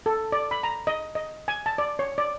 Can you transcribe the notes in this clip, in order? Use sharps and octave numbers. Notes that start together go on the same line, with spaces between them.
A4
D5
B5
A#5
D#5
D#5
G#5
A5
D5
C#5
D5